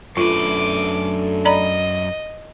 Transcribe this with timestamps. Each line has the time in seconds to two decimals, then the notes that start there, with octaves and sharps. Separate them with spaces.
0.17 F#2 A3 D4 F4 A4 B4 D6
1.45 D5 D#5 A#5 B5